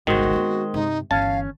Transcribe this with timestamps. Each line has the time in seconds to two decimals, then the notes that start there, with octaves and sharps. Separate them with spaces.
0.07 G1 C2 D#3 G#3 F#4 C5
0.33 B3 C4
0.74 G2 C3 D#4
1.11 G1 E3 C#4 F5 A5